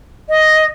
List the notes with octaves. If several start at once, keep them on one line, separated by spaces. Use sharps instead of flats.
D#5